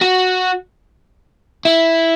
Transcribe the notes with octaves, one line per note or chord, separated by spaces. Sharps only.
F#4
E4